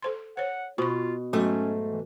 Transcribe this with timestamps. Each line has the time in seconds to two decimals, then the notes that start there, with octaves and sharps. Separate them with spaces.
0.03 A4 C5 C6
0.37 C5 C#5 F#5
0.78 B2 F4 C5 C#6
1.33 G#2 F#3 A3 B3 C#4 F#4
1.90 E3